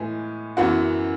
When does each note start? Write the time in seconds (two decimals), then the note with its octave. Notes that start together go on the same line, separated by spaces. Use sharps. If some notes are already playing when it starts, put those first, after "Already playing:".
Already playing: A2 E3 G#3 B3 G#5
0.57 F#2 E3 B3 F#4 F#5